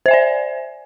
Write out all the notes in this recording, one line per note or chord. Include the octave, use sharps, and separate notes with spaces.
C5 D5 E5 G#5